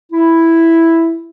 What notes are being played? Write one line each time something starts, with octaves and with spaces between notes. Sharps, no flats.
E4